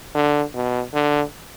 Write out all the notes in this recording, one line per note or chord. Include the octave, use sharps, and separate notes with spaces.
D3
B2
D3